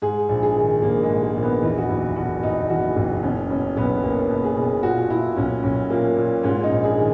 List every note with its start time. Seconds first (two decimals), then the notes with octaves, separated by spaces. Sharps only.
0.02 G#2 G#4
0.29 A#1
0.43 G#4
0.56 D#3
0.82 A#1 A#3
1.03 G#3
1.09 G#2
1.23 A#3
1.36 A#1
1.43 B3
1.62 E2 D#4
1.78 F#4
1.89 F#1 E4
2.16 B2 F#4
2.43 F#1 D#4
2.70 E2 F#4
2.97 F#1
3.23 B2 C#4
3.49 B2 C#4
3.77 B1 B3
4.03 B1 A#3
4.30 B2
4.44 G#4
4.57 B2
4.83 A#2 F#4
5.10 A#2 E4
5.36 B1 C#4
5.63 B1 C#4
5.90 A#2 A#3
6.17 A#2
6.43 G#2 C#4
6.64 D#4
6.71 A#1
6.84 G#4
6.98 D#3